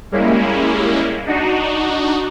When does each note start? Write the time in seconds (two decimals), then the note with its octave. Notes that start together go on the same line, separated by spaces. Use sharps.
0.12 G3 G#3 A#3 C#4 E4
1.26 D4 D#4 F#4